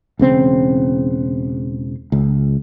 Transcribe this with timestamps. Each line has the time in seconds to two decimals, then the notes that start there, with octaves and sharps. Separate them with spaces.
0.19 E1 C#3 C4
2.12 C#2